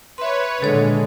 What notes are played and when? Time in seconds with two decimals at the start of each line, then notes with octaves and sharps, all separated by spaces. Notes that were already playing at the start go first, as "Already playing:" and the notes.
0.18 B4 C#5 E5 C6
0.62 A#2 D3 G#3 A4 C#5